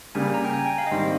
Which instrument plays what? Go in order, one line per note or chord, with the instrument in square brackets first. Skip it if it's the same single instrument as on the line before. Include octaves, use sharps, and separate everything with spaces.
[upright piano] C#3 G3 A#3 [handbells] G#5
[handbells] A#5
G5
G#5
G5
F5
D#5
[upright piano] G#2 D#3 G3 C4 [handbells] F5